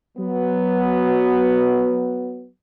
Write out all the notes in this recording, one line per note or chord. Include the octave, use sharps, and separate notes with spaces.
F#3 B3